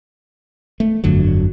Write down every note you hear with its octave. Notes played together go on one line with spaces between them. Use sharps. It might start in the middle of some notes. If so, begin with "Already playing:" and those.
A3
G1 F2 D3 F#3